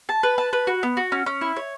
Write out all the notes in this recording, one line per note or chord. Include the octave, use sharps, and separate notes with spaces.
A5
B4
A5
B4
F#4
B3
F#4
C#4
C#4
E4
C#5